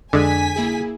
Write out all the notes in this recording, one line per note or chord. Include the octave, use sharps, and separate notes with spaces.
F2 D3 G#3 D4 G#5 B6
A#3 E4 G#4